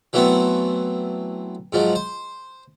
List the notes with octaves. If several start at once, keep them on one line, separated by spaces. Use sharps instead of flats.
E3 F#3 A3 B3 C4
G#2 F3 F#3
C5